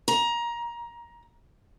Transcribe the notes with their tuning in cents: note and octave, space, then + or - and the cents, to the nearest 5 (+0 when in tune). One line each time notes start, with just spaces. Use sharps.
A#5 +20